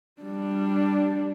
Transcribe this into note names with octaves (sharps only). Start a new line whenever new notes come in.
G3 D4